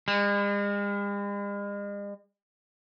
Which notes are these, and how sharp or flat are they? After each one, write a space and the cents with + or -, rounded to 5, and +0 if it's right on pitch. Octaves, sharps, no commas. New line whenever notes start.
G#3 -45